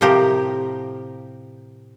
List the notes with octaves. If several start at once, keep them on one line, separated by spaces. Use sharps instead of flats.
A2 C3 F3 G4 A#4